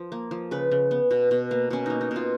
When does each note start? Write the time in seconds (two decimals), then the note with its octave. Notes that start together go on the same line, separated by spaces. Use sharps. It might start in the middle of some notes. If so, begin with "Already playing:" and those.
Already playing: F3
0.12 A#3
0.31 F3
0.51 C#3 B4
0.71 C#3
0.91 B3
1.11 B2
1.31 B2
1.51 A#3
1.70 B2 C#4
1.86 A#3 D#4
2.01 D#4
2.11 B2
2.16 F4